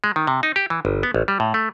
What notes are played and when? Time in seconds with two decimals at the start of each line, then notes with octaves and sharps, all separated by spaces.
0.04 G#3
0.16 D#3
0.27 C3
0.43 D#4
0.56 G4
0.70 E3
0.85 G1
1.03 B3
1.14 A1
1.28 G3
1.40 A2
1.54 A3